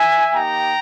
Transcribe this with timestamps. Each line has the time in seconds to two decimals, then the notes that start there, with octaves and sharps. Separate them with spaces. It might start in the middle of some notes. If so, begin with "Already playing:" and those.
Already playing: E5 G#5
0.33 A#3 D#4 G4 G5 A#5